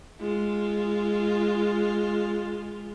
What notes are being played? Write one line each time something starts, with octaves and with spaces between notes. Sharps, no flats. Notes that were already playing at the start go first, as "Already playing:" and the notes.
G#3 F4